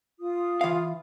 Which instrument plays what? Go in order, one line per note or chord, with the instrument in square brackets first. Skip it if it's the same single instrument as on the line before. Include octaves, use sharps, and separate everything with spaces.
[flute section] F4 D#6
[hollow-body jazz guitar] E3 F5